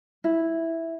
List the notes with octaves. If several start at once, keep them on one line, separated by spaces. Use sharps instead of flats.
E4